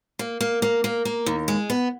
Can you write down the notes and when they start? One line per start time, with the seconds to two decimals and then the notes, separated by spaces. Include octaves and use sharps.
0.19 A#3
0.41 A#3
0.62 A#3
0.84 A#3
1.05 A#3
1.26 D#2
1.48 G#3
1.70 B3